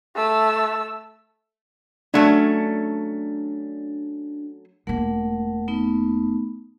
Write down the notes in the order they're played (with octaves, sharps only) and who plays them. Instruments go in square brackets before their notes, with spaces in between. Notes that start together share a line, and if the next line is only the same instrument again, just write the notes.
[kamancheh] A3 E6
[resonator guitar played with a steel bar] F#3 A3 C#4 [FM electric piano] D4
[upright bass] E1 A#3 [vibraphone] A3 A#4 F#5
[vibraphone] A3 B3 D#4